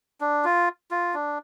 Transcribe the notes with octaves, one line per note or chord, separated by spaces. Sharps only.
D4
F4
F4
D4